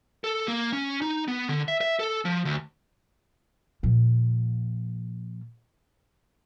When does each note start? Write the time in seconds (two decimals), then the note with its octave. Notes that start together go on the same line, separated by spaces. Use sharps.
0.24 A4
0.48 A#3
0.73 C#4
1.02 D#4
1.28 B3
1.49 D3
1.68 E5
1.81 E5
1.99 A4
2.25 F3
2.45 D2
3.83 A#2 F3